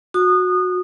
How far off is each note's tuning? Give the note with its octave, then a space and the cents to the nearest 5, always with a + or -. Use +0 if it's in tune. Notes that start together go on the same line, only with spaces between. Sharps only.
F#4 -20 D#6 -25